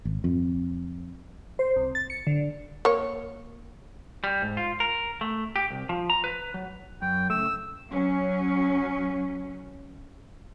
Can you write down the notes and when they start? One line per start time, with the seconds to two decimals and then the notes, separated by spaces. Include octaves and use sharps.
0.05 G#1
0.24 F2
1.59 C5
1.76 C2
1.95 A6
2.10 C#7
2.27 D3
2.85 A#3 C#5
4.24 G3
4.42 G#2
4.57 F4
4.80 A#4
5.21 A3
5.56 G4
5.70 C2
5.89 F3
6.10 A#5
6.24 B4
6.54 F#3
7.02 F#2 G5
7.30 C#3 A3 E6
7.90 F#3 C#4